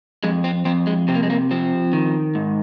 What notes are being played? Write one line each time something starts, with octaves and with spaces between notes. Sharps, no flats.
F2 G#3
C4
F2 C4
G#3
C3 C4
A#3
G#3
A#3
F3 C4
D#3
G#2